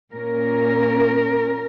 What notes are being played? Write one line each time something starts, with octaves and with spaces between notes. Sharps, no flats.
A#2 A#3 C#4 A#4